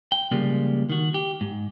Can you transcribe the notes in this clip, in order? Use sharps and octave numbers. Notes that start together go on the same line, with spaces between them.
G5
C#3 F3 G3 G#3 A#3
D#3 F#4
G4
G#2